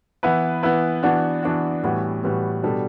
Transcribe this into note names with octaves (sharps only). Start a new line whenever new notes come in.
E3 B3 E4 B4
E3 B3 E4 B4
E3 B3 D4 F#4
E3 B3 D4 F#4
A2 E3 G3 B3 F#4
A2 E3 G3 B3 F#4
B2 G3 D4 A4